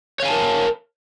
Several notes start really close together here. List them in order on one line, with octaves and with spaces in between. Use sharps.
C#5 F5 G#5 A5 A#4